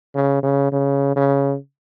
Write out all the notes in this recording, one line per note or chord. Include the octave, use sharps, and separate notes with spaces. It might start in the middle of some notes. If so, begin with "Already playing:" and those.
C#3
C#3
C#3
C#3